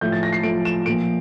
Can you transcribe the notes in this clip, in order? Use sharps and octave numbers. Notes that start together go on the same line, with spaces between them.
A2 F3 G6
A6
A#6
C7
A2 F3 D7
E7
A#2 F3 D7